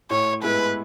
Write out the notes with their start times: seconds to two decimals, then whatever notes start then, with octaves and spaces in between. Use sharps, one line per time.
0.10 A2 C#5
0.43 G#3 B3 E4 B4